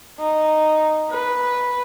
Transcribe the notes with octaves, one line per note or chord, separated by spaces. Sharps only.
D#4
B4